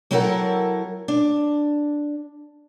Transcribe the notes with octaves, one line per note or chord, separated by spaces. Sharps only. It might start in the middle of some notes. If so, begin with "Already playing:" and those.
F#3 C4 E4 A4 A#4 F#5
D4